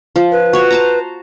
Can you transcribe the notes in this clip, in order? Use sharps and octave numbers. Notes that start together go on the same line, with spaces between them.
F3
B4
F#4 C#5
C5 A5 A#5